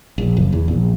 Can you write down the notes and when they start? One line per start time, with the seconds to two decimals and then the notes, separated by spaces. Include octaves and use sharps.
0.18 A#1
0.37 F#1
0.53 E2
0.68 A#1